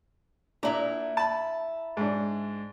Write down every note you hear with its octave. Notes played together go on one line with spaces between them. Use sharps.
A#2 D4 E4 A#5
A5 B5
G#2 D4